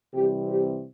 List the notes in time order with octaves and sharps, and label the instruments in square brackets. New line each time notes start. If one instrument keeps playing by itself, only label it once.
[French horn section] C3 E3 G3 C4 G4
G4